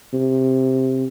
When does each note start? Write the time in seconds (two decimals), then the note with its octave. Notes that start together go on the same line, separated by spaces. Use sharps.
0.13 C3